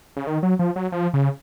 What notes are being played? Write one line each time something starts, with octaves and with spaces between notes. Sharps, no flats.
C#3
D#3
F#3
F3
F#3
F3
C#3